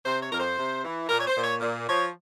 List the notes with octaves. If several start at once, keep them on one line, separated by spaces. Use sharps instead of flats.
C3 C5
C#5
F2 A#4
C5
C3
E3
A#2 A#4
C#5
C5
A#2
C#5
A#2
F3 C#5